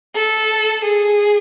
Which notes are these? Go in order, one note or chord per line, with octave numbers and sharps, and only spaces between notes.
A4
G#4